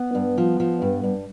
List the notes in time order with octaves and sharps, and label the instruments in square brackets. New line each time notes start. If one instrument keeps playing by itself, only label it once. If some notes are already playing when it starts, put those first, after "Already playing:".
Already playing: [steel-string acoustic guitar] B3
G2
F3
F3
G2
G2